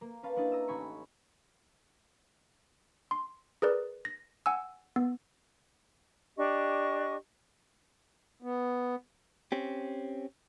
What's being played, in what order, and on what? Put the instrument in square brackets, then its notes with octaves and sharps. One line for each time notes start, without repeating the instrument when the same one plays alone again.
[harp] A#3
C#4 B4 F5 A5
C#4 D4 E4 D#5 A5
A#5 D#6 E6
A1 A2 D#4 G#5 B5 C#6
[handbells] C6
G#4 A#4 B4 D5
A#6
F#5 G#5 E6
B3
[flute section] D4 G4 D#5 C#6
[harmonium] B3
[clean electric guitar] C4 C#4 G4